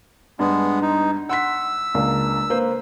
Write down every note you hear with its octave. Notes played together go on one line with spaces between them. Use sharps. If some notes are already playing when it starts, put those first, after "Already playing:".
G2 G#3 B3
D#4
F#5 C6 E6 B6
C#2 A#3 D4
A#3 B4 C5